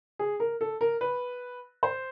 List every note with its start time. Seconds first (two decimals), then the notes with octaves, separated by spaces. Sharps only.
0.19 G#4
0.40 A#4
0.61 A4
0.81 A#4
1.01 B4
1.83 C5